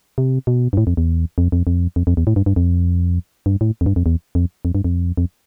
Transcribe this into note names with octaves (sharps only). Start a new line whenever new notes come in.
C3
B2
G2
A2
F2
E2
F2
F2
F2
F2
F2
E2
A2
G2
G2
F2
G2
A2
F2
G2
F2
E2
F2
F2
G2
F2
F2